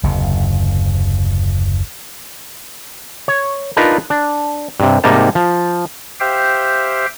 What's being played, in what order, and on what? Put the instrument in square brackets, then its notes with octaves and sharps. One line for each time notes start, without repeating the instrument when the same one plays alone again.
[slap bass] F#1 D#2 C3
[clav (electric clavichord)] C#5
D4 D#4 F4 A#4 B4
D4
G2 C3
G#2 C3 G3 A#3 D#4 A5
F3
[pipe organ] G4 C5 E5 F5 G5